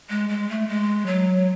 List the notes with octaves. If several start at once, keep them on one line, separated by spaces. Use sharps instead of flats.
G#3
G#3
A3
G#3
F#3